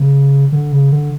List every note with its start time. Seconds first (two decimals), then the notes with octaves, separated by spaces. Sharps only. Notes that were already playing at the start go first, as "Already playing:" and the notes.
Already playing: C#3
0.52 D3
0.72 C#3
0.92 D3